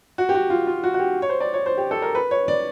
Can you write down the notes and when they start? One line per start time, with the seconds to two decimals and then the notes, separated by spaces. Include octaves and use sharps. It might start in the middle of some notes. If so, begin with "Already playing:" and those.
0.18 F#4
0.29 G4
0.35 F#4
0.50 F4
0.67 F4
0.84 F#4
0.94 F#4
0.99 G4
1.22 C#5
1.29 C5
1.41 D5
1.54 C#5
1.66 C5
1.77 G4
1.91 A4
2.02 A#4
2.15 B4
2.31 C#5
2.48 D5